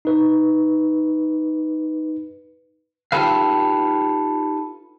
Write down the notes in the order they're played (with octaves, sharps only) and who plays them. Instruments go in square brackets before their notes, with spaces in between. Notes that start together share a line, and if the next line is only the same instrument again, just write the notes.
[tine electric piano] D#4 B4
[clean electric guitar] D#4 F4 G4 A4 B4 F5